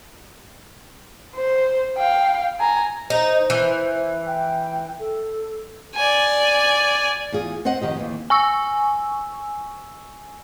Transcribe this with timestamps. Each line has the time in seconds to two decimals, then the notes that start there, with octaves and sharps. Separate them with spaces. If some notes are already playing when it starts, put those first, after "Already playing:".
1.35 C5
1.97 F5 G5
2.60 G#5 A#5
3.10 D#4 C5
3.50 E3
4.27 G5
5.00 A4
5.95 D5 G#5
7.32 E2 F4 G#4
7.65 C4 C5 D#5 F#5
7.82 F2 D#3 G4 D#5
7.97 D#2 E3
8.30 G#5 C#6 E6